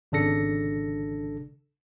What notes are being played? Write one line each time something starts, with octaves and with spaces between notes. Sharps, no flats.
G#1 C#3 D4 A4 A#6 C#7